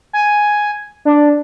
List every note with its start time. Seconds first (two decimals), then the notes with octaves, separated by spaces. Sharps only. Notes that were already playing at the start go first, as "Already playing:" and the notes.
0.13 G#5
1.05 D4